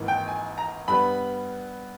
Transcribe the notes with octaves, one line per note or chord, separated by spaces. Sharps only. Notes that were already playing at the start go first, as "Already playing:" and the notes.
Already playing: G#1 G#2 E3 A#3
G5
G#5
A#5
G2 G3 B3 B5